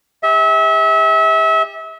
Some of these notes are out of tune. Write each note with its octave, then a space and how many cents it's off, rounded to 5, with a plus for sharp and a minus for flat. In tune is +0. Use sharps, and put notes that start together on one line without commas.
G4 +40 E5 -30